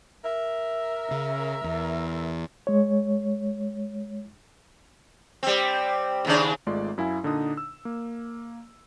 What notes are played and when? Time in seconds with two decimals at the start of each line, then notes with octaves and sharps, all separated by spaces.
0.25 A#4 E5
1.11 C#3
1.64 E2
2.67 G#3 C#5
5.43 G3 C4
6.25 D#2 C#3 D4
6.67 G#1 G#3 A3 F4 D5 C6
6.98 F#2 E4 F5 G#5
7.23 A#2 D3 D4 D#4 D#6
7.57 E6
7.85 A#3